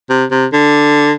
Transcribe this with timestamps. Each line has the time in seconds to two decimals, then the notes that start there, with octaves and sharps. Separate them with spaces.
0.10 C3
0.31 C3
0.53 D3